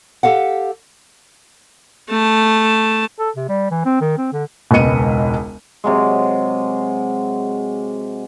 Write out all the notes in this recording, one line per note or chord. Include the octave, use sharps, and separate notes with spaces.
G4 A4 F5 F#5
A3 A5
A4
C3
G3
E3
C4
D#3
C4
D3
E1 C#2 B3 D#5 C#7 D#7
C3 F#3 G#3